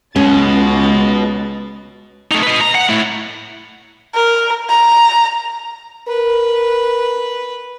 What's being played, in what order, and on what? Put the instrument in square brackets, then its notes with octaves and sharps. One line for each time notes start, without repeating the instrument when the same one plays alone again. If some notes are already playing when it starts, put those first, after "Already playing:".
[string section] C#2 A6 [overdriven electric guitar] B2 [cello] G#3 [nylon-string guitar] C#4
[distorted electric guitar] A3 D#4
B4 D#5
A#5
F#5
A3 E4
[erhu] A#4
A#5
[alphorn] A#4 [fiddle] B4